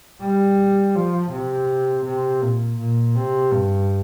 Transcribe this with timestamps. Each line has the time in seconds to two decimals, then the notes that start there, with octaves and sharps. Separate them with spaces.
0.21 G3
0.95 F3
1.32 C3
2.06 C3
2.42 A#2
2.78 A#2
3.15 C3
3.52 G2